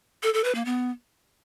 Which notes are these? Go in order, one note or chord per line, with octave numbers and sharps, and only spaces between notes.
A4
A4
B4
A#3
B3